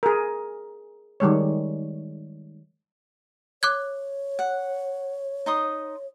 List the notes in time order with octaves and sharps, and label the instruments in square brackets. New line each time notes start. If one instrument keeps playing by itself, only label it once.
[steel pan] G#4 A#4
D#3 G3 G#3 C#5
[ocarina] C#5 [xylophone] D6 F#6 G#6
[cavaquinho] F#5
D#4 C6 D#6